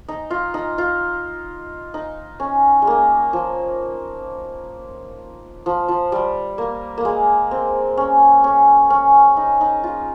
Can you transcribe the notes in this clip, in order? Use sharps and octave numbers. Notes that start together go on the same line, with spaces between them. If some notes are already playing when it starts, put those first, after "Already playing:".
D#4
F4
D#4
F4
D#4
C#4
G#3
A#3
F3
F3
F3
G3
A#3
A#3
G#3
C4
C#4
C#4
C#4
D#4
D#4
F4